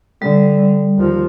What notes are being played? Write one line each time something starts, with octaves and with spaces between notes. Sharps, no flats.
D3 G3
D#2 F3